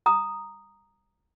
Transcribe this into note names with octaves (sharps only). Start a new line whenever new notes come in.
A#5 D#6